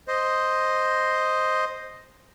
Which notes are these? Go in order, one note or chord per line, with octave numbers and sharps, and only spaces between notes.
C5 D#5